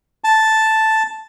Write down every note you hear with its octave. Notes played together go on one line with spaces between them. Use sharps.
A5